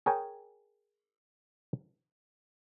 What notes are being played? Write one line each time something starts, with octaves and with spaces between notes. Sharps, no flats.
G#4 A#4 C#5 G5 G#5